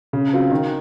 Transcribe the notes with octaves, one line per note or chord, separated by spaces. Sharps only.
C#3
F#3 C4 F4
D#3